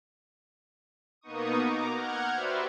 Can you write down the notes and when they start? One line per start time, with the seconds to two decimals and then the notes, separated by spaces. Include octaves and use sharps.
1.21 B2 A#3 B3 D#4 C#6 D#6
1.58 A#5 D6
1.90 F#5 F6 G6 G#6
2.32 F#4 G4 B4 C5 D5 E5